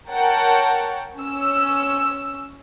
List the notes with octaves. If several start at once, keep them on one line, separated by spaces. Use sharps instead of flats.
A#4 C#5 F#5 G5 A5
C#4 E6